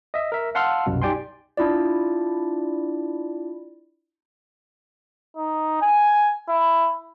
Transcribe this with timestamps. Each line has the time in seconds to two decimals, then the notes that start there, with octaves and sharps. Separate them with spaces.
0.14 D#5 E5
0.32 A#4 E5
0.55 F5 F#5 A5 C6 E6 F6
0.86 C2 F#2 B2
1.02 D#4 G4 D5 G5 G#5 C6
1.57 D4 E4 F4 D5
5.37 D#4
5.82 G#5
6.48 E4